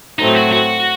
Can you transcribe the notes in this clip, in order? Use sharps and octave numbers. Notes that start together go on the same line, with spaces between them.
A2 F#3 A3 C4 D#4
F#4
F#4